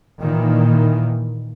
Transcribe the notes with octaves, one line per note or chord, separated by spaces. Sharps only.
A#2 D#3 E3 A#3